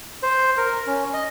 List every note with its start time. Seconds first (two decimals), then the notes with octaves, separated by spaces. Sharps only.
0.23 C5
0.57 A#4
0.87 C#4
1.13 D#5